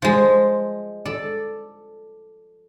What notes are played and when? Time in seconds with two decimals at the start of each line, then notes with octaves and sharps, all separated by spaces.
0.02 F3 G#3
1.05 A4 D5